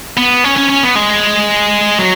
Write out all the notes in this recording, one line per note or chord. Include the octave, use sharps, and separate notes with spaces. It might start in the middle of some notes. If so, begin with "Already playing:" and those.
B3
C#4
C#4
C#4
B3
G#3
F#3